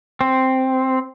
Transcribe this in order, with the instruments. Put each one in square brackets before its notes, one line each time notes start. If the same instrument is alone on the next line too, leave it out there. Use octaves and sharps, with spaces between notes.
[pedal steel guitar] C4